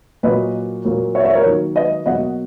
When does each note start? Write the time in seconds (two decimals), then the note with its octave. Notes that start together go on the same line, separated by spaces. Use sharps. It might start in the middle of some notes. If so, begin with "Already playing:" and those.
0.23 A#2 F#3 A#3 B4 D#5
0.85 A#2 F#3 A#3
1.15 C#5 E5
1.25 C#5 E5
1.35 A#4 C#5
1.46 D#3 F#3 A#3
1.76 B4 D#5
2.06 B2 F#3 A#3 D#5 F#5